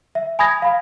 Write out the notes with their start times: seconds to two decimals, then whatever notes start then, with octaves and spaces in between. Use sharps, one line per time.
0.15 E5
0.39 G#5 B5 D#6 G#6 A#6
0.62 F5 B5